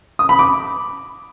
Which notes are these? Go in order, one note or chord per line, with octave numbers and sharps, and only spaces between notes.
D#6
B5
D6